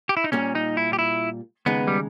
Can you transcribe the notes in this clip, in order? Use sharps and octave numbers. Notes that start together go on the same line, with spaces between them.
G4
E4
D#4
A#2 G3 A#3 C#4
D#4
E4
G4
E4
D#2 C#3 G#3 B3 D#4
G3